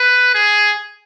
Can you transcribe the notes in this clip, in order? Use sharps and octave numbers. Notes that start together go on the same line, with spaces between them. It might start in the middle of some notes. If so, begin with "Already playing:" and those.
Already playing: B4
G#4